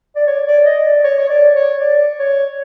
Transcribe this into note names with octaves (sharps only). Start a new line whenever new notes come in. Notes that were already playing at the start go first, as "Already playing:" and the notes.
D5
C#5
D5
D#5
D5
C#5
C#5
D5
C#5
D5
C#5